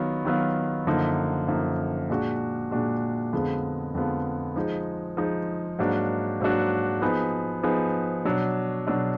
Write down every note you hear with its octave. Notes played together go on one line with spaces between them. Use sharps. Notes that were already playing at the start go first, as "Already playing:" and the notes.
Already playing: D#3 F#3 B3 F4
D#3 F#3 B3 F4
F#2 D3 F3 A#3 D#4
F#2 D3 F3 A#3 D#4
A#2 G#3 D4 F#4
A#2 G#3 D4 F#4
F2 D3 G#3 B3 F4
F2 D3 G#3 B3 F4
F3 G#3 D#4
F3 G#3 D#4
G#2 F#3 A#3 D4 F#4
G#2 F#3 A#3 D4 F#4
F3 B3 D#4 G#4 B4
F3 B3 D#4 G#4 B4
B2 F#3 D4
B2 F#3 D4